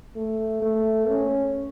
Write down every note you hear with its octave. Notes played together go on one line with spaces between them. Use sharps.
A3
A3
C#4